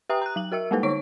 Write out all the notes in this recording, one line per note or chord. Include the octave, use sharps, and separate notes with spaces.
G4 B4 E5 G5 A#5 D#6
A#5 F#6
F#3 F#7
F#4 A#4 E5 E6
G3 G#3 A#3 D#4 A4 B4
D3 D#4 C#5 C#6 D7